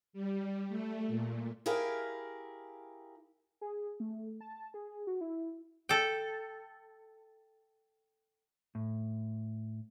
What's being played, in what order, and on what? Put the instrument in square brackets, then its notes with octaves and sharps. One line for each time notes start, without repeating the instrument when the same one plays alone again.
[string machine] G3
A3
A#2
[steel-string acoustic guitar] E4 G4 G#4 A#4 F5
[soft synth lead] G#4
A3
A5
G#4
F#4
E4
[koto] A4 G5
[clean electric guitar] A2